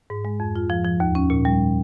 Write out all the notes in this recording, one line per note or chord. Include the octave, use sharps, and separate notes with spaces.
G#2
G#3
F2
F4
F3
F3
D#2
C#4
A#2
G3